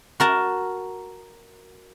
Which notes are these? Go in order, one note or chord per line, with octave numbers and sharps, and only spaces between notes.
F#4 A#4 A5